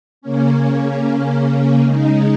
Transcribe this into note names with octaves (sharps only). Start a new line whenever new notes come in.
C#3 A#3 C#4
C#3 G#3 D#4